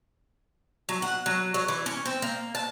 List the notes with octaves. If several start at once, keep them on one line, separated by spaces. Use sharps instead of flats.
F#3
F#5
F#3
F#3
E3
C#4
C4
A#3
A5